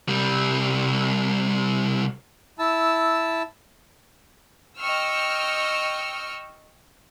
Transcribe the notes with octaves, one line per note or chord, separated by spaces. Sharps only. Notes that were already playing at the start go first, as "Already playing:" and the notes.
C2 G3
E4 A5 E6
D#5 G5 C#6 E6 F6